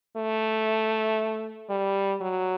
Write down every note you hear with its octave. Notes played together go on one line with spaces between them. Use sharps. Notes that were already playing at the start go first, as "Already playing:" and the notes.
A3
G3
F#3